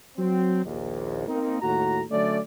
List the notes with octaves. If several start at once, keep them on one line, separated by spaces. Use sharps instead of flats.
F#3 C4
A#1 D#2
A#3 C4 D#4
D#2 A2 F#4 A#5
D3 F#3 A3 C#4 D5